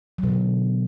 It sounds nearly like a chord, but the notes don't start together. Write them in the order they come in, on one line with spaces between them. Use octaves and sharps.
F#3 B2 D3